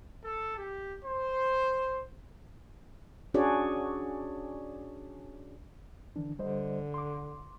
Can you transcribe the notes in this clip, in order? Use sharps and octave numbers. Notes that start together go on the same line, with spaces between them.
A4
G4
C5
C#4 D4 F#4 G#4 C#5 D5
D3 E3 D4
D3 G3 C5 D#5
C6 D6